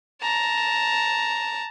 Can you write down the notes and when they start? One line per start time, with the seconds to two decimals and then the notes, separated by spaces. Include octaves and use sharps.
0.22 A5 A#5